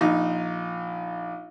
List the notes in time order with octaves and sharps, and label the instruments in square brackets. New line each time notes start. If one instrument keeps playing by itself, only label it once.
[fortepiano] A#1 D#4